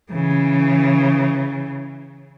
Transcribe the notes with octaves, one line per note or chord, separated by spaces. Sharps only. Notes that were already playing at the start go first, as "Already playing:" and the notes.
C#3 E3